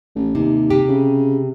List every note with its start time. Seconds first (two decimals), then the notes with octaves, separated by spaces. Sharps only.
0.16 A1
0.35 D#2 C3
0.70 C3 G4
0.88 C#3